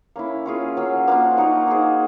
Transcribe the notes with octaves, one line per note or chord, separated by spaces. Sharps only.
A#3 C#4 E4
C#4 F4 G#4
F#3 A#3 C#4
F3 A#3 D4 F4
A#3 D#4 F#4 A#4
D#4 G#4 C5